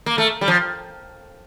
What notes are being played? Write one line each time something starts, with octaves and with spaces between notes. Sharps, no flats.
A#3
A3
G3
F3